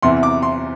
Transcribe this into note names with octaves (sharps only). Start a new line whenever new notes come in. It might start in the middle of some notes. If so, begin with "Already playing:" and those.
E2 C3 E3 C6
D6
C6